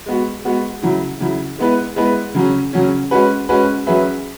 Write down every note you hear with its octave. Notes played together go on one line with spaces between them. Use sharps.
G#3 B3 F#4
G#3 B3 F#4
C#3 F#3 E4
C#3 F#3 E4
G#3 B3 E4 B4
G#3 B3 E4 B4
C#3 F#3 C#4
C#3 F#3 C#4
G#3 C#4 F#4 B4
G#3 C#4 F#4 B4
F#3 C#4 G#4 B4 E5